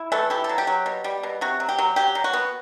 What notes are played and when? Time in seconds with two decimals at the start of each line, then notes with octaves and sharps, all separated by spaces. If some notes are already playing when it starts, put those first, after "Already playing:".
Already playing: E4
0.12 E3 A3 A4
0.30 E4 G4
0.44 A4
0.49 F#3
0.58 G4
0.67 F#3
0.86 B2
1.04 G3
1.23 B2
1.41 C3 F#4
1.60 F#3
1.69 G4
1.78 F#3
1.96 F#3 G4
2.15 F#3
2.24 F#4
2.33 B3